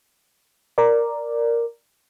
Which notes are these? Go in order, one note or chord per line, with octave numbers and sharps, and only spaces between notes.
A#4 D5